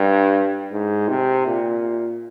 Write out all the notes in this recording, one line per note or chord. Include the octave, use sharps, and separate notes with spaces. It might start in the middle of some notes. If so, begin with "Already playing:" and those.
Already playing: G2
G#2
C3
A#2